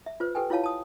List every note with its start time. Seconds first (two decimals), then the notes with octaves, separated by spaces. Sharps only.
0.06 E5
0.20 F4 B4 C5
0.35 G4 A4 B4 G5 G#5
0.50 E4 F4 C#5 F5 A5
0.64 A5 D#6